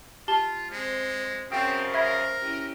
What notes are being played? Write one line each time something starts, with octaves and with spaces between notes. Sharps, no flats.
F4 G4 A5 G7
G#3 C4 C5
F#2 C#3 C4 C5 G5
A#4 E5 B5 G#6
C#4 E4 G4